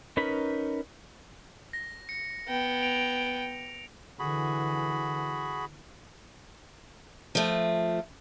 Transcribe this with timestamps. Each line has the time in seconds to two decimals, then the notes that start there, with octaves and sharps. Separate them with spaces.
0.17 C#4 D#4 A#4 B4 B5
1.73 A#6
2.09 C#7
2.48 B3 G5
2.82 D7 F7
4.19 D3 E3 F#4 G#4 B5
7.35 F3 A3